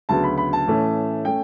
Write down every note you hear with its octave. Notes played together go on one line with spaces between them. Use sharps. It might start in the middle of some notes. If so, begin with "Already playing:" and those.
D2 C#3 F#3 B3 A5
B5
B5
A5
A2 E3 A3 C#4
A3 C#4 G5